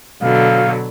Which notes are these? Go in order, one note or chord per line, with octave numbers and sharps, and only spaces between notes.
B2 D3 F#3 F5